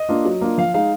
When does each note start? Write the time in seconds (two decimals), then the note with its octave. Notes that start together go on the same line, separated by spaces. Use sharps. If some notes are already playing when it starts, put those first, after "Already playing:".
Already playing: D#5
0.09 A#3 D4 F4
0.25 F#3
0.41 A#3 D4 F4
0.58 F3 F5
0.74 G#3 D#4 F5